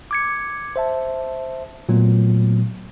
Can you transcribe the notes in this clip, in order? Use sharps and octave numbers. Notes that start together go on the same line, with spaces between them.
D6 G#6 C#7
C5 E5 A5
A#2 F#3 A3 B3